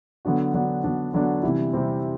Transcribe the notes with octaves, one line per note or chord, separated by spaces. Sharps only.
D3 F#3 B3 D4 F#4
D3 F#3 B3 D4 F#4
D3 F#3 B3 D4 F#4
D3 F#3 B3 D4 F#4
C3 E3 G3 C4 E4
C3 E3 G3 C4 E4